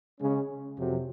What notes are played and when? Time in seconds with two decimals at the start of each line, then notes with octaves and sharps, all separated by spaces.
0.20 C#3 G#3 C#4
0.77 F2 C3 F#3